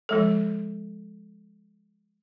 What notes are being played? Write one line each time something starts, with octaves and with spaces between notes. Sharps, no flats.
F3 G#3 A4